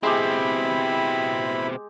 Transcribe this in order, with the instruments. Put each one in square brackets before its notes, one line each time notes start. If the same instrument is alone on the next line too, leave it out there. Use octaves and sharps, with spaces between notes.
[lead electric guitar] B2 C4 [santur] G#3 G4 [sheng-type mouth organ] E4 B5